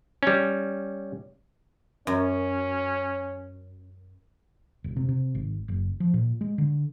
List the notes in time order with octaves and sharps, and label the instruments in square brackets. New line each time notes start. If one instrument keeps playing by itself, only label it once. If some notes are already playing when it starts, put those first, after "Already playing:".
[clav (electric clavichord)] G3 C#4
[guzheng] F#2 [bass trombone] C#4
[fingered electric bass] E1
C3
C3
G#1
F#1
F3
A#2
G#3
D3